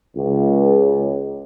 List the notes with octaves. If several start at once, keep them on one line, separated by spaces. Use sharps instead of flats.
C#2